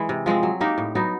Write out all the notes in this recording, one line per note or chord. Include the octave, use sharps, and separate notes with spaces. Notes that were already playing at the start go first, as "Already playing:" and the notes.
Already playing: E3 G#3
C3
F3 G#3 C4
F#3
A#3 D#4 G4
A2
F#3 B3 D#4